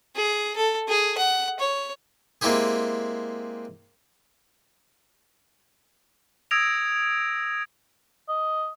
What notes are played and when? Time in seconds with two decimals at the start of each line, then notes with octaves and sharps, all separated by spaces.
0.15 G#4
0.56 A4
0.88 G#4
1.18 F#5
1.60 C#5
2.41 G#3 A#3 C4 E4 G4 G#4
6.51 D#6 E6 G#6 A#6 D7 F7
8.29 D#5